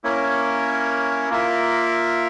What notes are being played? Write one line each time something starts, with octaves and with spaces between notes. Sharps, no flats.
A#3 C#4 E4 A#4 C#5
A#3 F4 A#4 E5